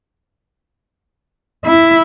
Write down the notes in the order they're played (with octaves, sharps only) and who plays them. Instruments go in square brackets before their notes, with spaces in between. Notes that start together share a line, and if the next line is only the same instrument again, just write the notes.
[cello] E4